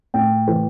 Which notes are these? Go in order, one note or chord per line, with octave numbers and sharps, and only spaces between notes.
A2 G5
E3